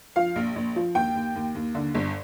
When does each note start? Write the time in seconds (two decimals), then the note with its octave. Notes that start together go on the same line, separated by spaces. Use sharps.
0.16 F3 F5
0.36 A#1
0.56 A#1
0.76 F3
0.95 D#2 G5
1.15 D#2
1.35 D#2
1.55 D#2
1.75 D3
1.95 G1